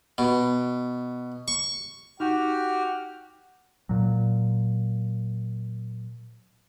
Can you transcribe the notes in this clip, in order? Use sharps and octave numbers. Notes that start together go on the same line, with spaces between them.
B2
C#6
D#4 F#4 G4 F#5 F6
A#2 F#3